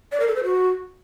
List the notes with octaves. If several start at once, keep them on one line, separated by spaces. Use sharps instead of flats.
D5
A#4
A4
C5
F#4